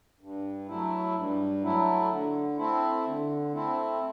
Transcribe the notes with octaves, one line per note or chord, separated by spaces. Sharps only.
G2
F#3 A3 E4
G2
F#3 A3 E4
D3
A3 C4 E4
D3
A3 C4 E4